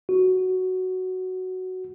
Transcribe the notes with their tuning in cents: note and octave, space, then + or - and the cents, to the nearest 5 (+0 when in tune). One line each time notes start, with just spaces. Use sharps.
F#4 +5